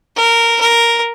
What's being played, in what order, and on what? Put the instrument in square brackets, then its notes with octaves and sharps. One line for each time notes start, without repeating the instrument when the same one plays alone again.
[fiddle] A#4
A#4